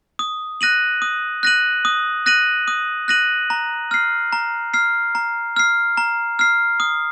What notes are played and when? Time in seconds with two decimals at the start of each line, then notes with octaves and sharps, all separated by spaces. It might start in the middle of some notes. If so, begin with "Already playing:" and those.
0.19 D#6
0.61 F#6 A#6 D#7 F#7
1.02 D#6
1.43 F#6 A#6 D#7 F#7
1.85 D#6
2.26 F#6 A#6 D#7 F#7
2.68 D#6
3.08 F#6 A#6 D#7 F#7
3.50 A#5
3.91 F6 C7
4.33 A#5
4.74 F6 C7
5.15 A#5
5.56 F6 C7
5.97 A#5
6.39 F6 C7
6.80 D#6